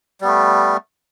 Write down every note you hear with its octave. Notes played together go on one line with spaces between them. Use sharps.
G3 A3 B3